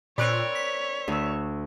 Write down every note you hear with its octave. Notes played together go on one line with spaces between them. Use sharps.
A#2 C4 A#4 C#5 D5 B5 F#6
B6
D2 E6